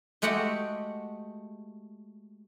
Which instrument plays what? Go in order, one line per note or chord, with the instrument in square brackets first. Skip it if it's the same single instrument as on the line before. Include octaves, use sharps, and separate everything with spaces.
[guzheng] G#3 A3 F#4 G4 F#5 G5